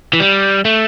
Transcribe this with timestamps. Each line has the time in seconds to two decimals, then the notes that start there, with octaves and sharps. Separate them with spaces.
0.13 E3
0.20 G3
0.65 A3